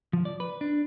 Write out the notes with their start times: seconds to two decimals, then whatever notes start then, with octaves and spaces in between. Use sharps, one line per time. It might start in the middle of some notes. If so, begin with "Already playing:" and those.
0.13 F3
0.25 D5
0.40 B4
0.61 D4